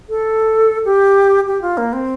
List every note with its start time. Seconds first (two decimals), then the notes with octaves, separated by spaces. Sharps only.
0.09 A4
0.85 G4
1.46 G4
1.62 F4
1.77 A#3
1.93 C4